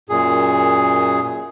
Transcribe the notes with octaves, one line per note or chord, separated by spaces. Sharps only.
F#2 A#2 G#4